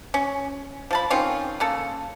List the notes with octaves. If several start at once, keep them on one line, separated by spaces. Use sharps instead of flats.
C#4
F3 A5 B5
D#3 C4 C#4 F4
C#3 A#3 A4